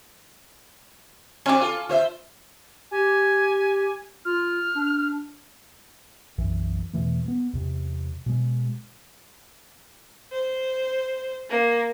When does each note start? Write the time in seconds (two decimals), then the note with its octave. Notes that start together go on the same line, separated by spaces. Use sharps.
1.46 C4 D4 F#4 G#5 D6
1.60 F4 A4
1.89 F4 C5 E5
2.91 G4 G#5
4.25 F4 F6
4.75 D4
6.38 B1 F#2 E3
6.93 E2 B2 E3 A3
7.25 A3 B3
7.53 E2 C3
8.26 B2 G#3
10.32 C5
11.50 A#3